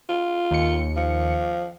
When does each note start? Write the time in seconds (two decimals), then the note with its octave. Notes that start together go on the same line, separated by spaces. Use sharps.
0.09 F4
0.51 D#2 C#7
0.97 F3